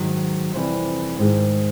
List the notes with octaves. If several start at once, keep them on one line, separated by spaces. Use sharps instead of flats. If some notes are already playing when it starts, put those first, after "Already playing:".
Already playing: G#2 D#3 F#3
F2 C3 E3 G3
G#2 D#3 G#3